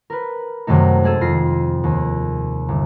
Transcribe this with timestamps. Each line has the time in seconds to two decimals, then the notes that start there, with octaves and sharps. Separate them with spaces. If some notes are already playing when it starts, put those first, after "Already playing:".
0.10 A#4 B4
0.67 F#2 C3 D#3 A3 D#4
1.03 G#3 G#4 A4
1.21 F2 F4 A#6 C7
1.84 D#2
2.68 G1